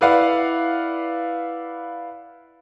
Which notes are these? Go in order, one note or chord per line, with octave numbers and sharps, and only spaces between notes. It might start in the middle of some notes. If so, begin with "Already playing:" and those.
E4 B4 D5 F5 F#5